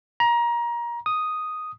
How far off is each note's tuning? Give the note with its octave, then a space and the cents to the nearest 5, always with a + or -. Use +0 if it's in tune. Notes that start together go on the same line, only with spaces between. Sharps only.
A#5 +25
D#6 +0